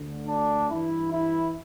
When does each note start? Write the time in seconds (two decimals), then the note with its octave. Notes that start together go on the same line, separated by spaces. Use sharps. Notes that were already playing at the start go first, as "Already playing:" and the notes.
Already playing: D2 D3
0.28 D4
0.70 G2 E3 E4
1.12 E4